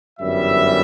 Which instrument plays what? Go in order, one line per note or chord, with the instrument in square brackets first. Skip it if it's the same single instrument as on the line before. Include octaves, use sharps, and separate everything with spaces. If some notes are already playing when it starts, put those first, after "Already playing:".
[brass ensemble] G1 F#2 E3 G3 E5